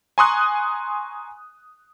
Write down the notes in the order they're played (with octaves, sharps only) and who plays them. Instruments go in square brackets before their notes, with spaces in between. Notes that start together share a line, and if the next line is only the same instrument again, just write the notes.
[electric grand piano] G#5 A#5 C6 C#6 D#6 F#6